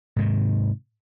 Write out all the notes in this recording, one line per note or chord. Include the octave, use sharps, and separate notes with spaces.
G#2 C3 D#3